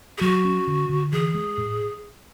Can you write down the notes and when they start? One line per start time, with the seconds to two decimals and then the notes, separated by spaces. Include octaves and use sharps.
0.18 G#4
0.21 F#3 F#4
0.45 C#4
0.67 D3
0.89 D3
1.12 E3 G#4
1.35 G#3
1.58 A2